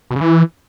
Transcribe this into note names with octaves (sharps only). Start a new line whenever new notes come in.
B2
C#3
E3